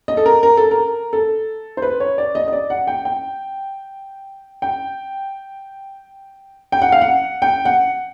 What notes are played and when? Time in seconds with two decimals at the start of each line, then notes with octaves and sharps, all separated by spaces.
0.08 D#5
0.17 A4
0.26 A#4
0.43 A#4
0.57 A4
0.71 A#4
1.13 A4
1.77 C5
1.82 B4
2.00 C#5
2.18 D5
2.35 D#5
2.48 D#5
2.53 D5
2.70 F#5
2.87 G5
3.05 G5
4.62 G5
6.72 G5
6.82 F#5
6.92 F5
7.02 F#5
7.42 G5
7.65 F#5